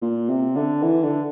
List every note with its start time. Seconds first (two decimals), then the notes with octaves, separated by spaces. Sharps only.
0.02 A#2
0.29 C3
0.56 D3
0.83 E3
1.03 D3